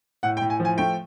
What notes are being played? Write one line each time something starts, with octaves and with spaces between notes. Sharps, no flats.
A2 F#5
G5
A2
G#5
F3
G#5
A3 G5